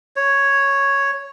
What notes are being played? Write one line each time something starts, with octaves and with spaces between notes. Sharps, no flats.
C#5